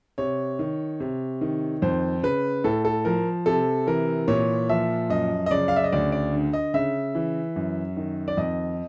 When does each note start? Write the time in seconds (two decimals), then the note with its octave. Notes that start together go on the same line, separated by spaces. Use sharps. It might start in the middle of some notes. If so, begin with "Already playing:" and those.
0.18 C3 C#5
0.59 D#3
1.00 C3
1.41 D#3
1.82 F2 C5
2.23 C#3 B4
2.64 A2 A4
2.85 A4
3.05 F3 A#4
3.46 C3 A4
3.87 E3 A#4
4.28 A#2 C#5
4.69 F3 E5
5.09 F#2 D#5
5.46 D#5
5.51 C#3 D5
5.68 F5
5.76 E5
5.84 D#5
5.92 D2 D5
6.12 D5
6.33 D3
6.53 D#5
6.74 C#3 E5
7.15 E3
7.56 F#2
7.97 D#3
8.28 D5
8.37 F2 D#5